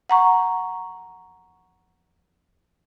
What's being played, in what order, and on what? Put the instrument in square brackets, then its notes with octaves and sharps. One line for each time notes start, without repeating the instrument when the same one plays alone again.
[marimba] F#5 A#5 C#6